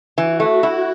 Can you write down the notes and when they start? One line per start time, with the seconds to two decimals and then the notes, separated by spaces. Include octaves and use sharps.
0.17 E3 F#4
0.40 A3
0.63 E4